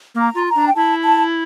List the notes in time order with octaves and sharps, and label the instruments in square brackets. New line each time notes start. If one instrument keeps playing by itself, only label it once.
[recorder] A#3
[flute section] A#5
[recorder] F4
[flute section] A#5
[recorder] D4
[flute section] G5
[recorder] E4 [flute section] A5
[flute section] A5